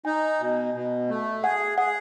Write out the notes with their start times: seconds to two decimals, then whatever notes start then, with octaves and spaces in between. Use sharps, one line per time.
0.05 D#4 G#5
0.41 B2
0.74 B2
1.09 A3
1.43 G#4 F#5
1.78 G#4 F#5